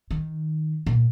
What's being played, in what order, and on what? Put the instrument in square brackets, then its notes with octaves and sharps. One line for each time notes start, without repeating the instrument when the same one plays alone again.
[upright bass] D#3
A#2